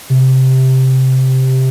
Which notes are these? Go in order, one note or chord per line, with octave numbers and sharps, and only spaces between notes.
C3